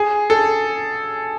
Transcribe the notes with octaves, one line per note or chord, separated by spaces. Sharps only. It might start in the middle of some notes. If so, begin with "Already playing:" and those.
Already playing: G#4
A4